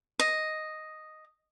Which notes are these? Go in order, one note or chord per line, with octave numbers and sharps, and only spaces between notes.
D#5